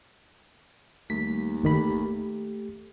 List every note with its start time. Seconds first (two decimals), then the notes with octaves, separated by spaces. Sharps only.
1.10 D#2 G3 A3 B6
1.63 G1 D#3 A3 G4 A4 B5